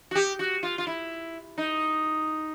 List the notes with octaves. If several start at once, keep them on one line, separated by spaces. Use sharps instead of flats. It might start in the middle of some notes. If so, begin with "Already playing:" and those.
F#4
G4
F#4
F4
F4
E4
D#4